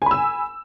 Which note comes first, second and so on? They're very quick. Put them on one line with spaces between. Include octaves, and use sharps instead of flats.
G#5 B5 E6